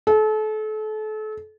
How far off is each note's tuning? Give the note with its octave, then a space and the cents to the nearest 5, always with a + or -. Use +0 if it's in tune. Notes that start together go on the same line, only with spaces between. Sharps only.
A4 -35